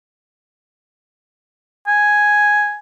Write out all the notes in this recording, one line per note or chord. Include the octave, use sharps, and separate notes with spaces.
G#5